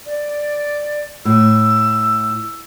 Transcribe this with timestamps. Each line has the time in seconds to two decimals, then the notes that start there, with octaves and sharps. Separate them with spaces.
0.06 D5
1.25 A2 E6